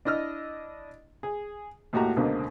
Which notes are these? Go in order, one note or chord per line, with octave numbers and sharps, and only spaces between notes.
D4 E4 D#5 E6 F6
G#4
D#2 A2 F#4 G4 A#5
C#2 B2 D3 A#3 C4